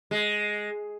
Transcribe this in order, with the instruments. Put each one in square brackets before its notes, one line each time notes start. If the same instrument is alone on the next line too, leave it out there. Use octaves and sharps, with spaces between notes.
[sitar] G#3